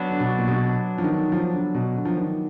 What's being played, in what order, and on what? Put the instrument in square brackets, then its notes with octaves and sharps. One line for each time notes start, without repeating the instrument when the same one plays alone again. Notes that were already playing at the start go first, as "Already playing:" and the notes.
Already playing: [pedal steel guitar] F#3 B3 D4
[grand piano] D3
B2
A#2
B2
F3
D#3
F3
D3
B2
D3
F3
D#3